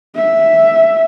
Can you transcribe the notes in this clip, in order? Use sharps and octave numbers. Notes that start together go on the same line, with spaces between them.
E5